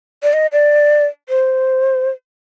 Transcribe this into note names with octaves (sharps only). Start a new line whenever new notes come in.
D5
D#5
D5
C5